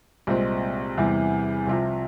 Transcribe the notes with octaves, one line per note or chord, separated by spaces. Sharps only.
C2 A#2 G#3 C4
E2 C3 E3 G3
C2 C3 F3